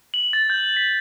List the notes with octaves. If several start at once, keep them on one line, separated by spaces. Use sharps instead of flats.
F#7
A6
G6
B6